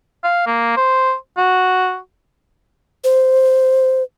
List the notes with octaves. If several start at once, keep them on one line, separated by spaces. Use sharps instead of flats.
F5
A#3
C5
F#4
C5